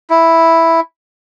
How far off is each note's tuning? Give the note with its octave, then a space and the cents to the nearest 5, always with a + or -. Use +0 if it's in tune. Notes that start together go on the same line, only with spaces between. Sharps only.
E4 +0